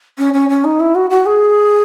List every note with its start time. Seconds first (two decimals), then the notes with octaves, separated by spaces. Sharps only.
0.18 C#4
0.33 C#4
0.49 C#4
0.64 D#4
0.79 E4
0.95 F#4
1.10 F#4
1.26 G#4